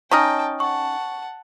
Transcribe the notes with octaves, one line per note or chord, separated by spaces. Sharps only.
C#4 D#4 D#5 G5 A5 C#6 D#6 F6
F#5 A5 C#6